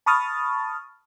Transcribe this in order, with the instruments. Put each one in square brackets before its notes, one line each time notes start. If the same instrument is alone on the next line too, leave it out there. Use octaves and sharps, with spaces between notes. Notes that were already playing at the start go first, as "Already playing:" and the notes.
[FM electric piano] A5 B5 C#6 D#6 F6 A6